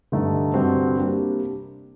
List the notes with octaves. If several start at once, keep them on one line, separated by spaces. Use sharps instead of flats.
G2 D3 A3 D#4
G2 D3 G3 C4 F#4
C3 G3 A#3 D4